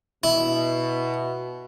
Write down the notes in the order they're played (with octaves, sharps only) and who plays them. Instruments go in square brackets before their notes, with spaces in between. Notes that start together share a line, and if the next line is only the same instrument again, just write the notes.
[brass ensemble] B2 [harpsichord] E4